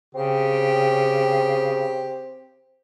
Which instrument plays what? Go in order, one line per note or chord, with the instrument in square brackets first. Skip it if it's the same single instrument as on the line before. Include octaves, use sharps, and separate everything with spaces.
[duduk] C#3 [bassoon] C4 [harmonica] G4